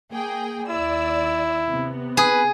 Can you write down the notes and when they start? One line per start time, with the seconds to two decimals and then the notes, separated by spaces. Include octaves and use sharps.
0.13 A#3 G#4 G5
0.70 D#2 E4 D5 E6
1.69 C3 B3
2.17 G#4 B4